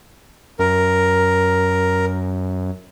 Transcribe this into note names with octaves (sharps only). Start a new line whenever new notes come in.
F#2 A#4